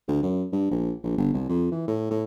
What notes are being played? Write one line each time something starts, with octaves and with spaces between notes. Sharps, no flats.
D2
F#2
G2
A#1
A#1
G1
C2
F2
E3
A2
A2